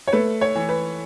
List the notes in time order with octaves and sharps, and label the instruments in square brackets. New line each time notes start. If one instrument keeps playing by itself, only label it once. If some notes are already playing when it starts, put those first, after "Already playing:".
[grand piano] C#5
A3 B4
C#5
E3
B4